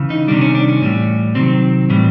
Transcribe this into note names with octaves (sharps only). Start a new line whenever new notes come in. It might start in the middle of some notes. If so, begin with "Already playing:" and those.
Already playing: C#3 E3
D#4
C3 D#3 G3 D4
C#4
D4
C#4
A2 E3 G3
C3 D#3 F#3 C4
A2 E3 G3